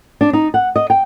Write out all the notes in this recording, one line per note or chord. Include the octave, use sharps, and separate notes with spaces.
D4
D#4
F#5
D#5
G5